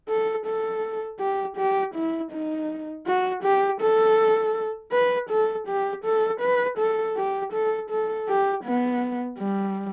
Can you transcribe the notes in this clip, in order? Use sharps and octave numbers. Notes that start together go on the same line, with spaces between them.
A4
A4
G4
G4
E4
D#4
F#4
G4
A4
B4
A4
G4
A4
B4
A4
G4
A4
A4
G4
B3
G3